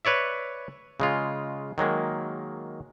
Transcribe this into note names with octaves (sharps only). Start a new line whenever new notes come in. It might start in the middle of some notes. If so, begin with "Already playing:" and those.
B4 C#5 D5 E5
C#3 G#3 F4
D#3 F#3 G#3 A#3